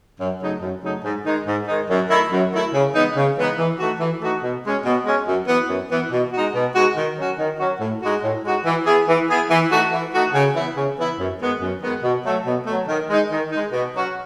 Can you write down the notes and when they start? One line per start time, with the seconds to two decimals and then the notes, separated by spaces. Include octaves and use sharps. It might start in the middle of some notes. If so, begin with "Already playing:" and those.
0.21 F#2
0.41 C#3 F#3 A3 D#4
0.62 F#2
0.83 C#3 F#3 A3 D#4
1.05 G#2
1.26 D#3 G#3 D#4
1.46 G#2
1.68 D#3 G#3 D#4
1.90 F#2
2.10 D#3 A3 E4
2.32 F#2
2.53 D#3 A3 E4
2.74 C#3
2.95 E3 G#3 B3 D#4
3.17 C#3
3.37 E3 G#3 B3 D#4
3.58 E3
3.80 A3 D#4 F#4
4.00 E3
4.21 A3 D#4 F#4
4.43 B2
4.64 G#3 C#4
4.86 B2
5.06 G#3 C#4
5.28 F#2
5.48 E3 B3
5.69 F#2
5.90 E3 B3
6.12 B2
6.33 G#3 D#4 F#4
6.55 B2
6.75 G#3 D#4 F#4
6.97 D#3
7.18 F#3 C#4 F#4
7.38 D#3
7.59 F#3 C#4 F#4
7.81 A2
8.03 G#3 D#4 F#4
8.24 A2
8.45 G#3 D#4 F#4
8.66 E3
8.86 B3 E4 G#4
9.08 E3
9.29 B3 E4 G#4
9.51 E3
9.71 A3 D#4 F#4
9.93 E3
10.14 A3 D#4 F#4
10.35 C#3
10.55 E3 B3 E4
10.77 C#3
10.98 E3 B3 E4
11.19 F#2
11.41 D#3 G#3 B3
11.62 F#2
11.82 D#3 G#3 B3
12.03 B2
12.25 F#3 A3
12.47 B2
12.67 F#3 A3
12.88 D#3
13.10 G#3 D#4
13.31 D#3
13.52 G#3 D#4
13.73 B2
13.95 F#3 C#4 F#4